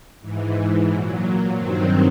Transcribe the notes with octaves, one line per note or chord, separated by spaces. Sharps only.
G#2 E3
A#2 F#3
G2 D#3 F#3 C4